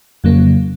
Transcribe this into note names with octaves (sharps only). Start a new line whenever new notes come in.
F2 C#3 F#3 A#3